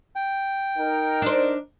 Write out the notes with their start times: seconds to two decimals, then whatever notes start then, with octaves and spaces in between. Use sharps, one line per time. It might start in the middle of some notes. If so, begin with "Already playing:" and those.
0.16 G5
0.78 D#4 A#4
1.22 D4 C5